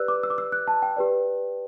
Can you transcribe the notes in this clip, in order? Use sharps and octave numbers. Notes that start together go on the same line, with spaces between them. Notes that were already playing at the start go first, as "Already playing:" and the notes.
Already playing: G4 B4 D5 E6 F#6
D6
E6
D6
E6
F#6
A5
G5
G4 B4 D5